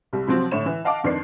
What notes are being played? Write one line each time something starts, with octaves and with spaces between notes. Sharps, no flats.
C2 G3
C3 F3 F#3 C4
A2 D3 C#5 E7
E3
D#5 F5 F#5 A5 D6
F2 D#3 D4 B4 D5 C7